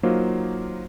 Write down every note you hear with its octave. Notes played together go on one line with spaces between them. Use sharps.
F#3 A#3 D#4 F4 C5